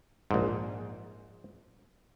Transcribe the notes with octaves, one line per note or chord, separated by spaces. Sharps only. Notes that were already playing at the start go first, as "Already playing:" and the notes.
A#1 G#2